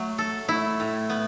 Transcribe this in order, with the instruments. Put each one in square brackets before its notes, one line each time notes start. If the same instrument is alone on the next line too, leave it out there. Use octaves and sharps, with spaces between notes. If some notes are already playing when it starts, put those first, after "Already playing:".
Already playing: [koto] F#3 [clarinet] A3
[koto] A4
[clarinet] A3 [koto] E4
[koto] A2
B3